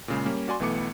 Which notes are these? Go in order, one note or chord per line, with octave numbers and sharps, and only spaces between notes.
A#2 C#3 G#3
G3 A#3 C#4
F#4 D5 G#5 C6
B1 E3 A3 B3 D6 C#7